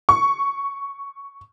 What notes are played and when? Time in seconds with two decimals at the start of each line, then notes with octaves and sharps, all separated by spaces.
0.09 C#6